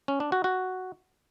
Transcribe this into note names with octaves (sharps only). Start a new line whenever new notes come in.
C#4
D4
F#4
F#4